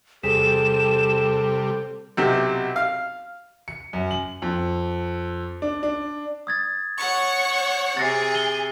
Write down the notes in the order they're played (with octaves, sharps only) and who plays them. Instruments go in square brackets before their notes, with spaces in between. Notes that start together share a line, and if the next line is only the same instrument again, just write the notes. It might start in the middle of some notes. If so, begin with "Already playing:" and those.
[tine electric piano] E2 G#4 B6 [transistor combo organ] C3 G3 [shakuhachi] A4 [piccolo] E7
[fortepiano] B1 C3
F5
[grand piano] C#7
F#2
F#7
F2
D4
D4
[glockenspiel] D#6 G#6 A6
[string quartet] C#5 F#5 C#6
[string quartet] C3 G#4 [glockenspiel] A6 A#6 C7
[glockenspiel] D#7 G7